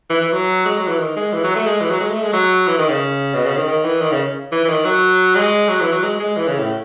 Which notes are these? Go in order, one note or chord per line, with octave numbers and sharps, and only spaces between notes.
E3
E3
F#3
G#3
F#3
E3
D#3
G#3
E3
F#3
A3
G#3
E3
F#3
G#3
A3
G#3
F#3
E3
D#3
C#3
B2
C#3
D#3
D#3
E3
D#3
C#3
E3
E3
D#3
F#3
G#3
F#3
E3
F#3
G#3
G#3
E3
C#3
A2